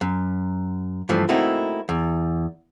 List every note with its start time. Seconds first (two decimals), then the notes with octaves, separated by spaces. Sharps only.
0.01 F#2
1.09 G2 E3 F3 A3
1.29 A3 A#3 C4 D#4 E4 F#4
1.89 E2